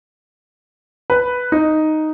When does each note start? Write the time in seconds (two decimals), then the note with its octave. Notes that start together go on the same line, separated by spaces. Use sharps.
1.10 B4
1.52 D#4